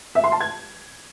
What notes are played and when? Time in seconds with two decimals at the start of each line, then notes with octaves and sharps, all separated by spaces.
0.15 E5
0.24 C6
0.32 A5
0.41 G#6